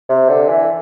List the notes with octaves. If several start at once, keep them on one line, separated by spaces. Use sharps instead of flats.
C3
D3
E3